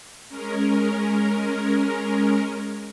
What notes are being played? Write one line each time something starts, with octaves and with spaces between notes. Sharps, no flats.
G#3 C#4 A#4